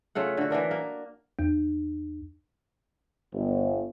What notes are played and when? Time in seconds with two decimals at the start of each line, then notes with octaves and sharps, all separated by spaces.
0.15 C#3 A3 F4 F#5
0.37 D3 F#4
0.51 E3 A#3 D4 A#4
0.71 A#3
1.39 E2
3.33 G1